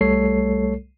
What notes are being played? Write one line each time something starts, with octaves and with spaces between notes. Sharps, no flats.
C2 G3 A3 A4 C#5 C7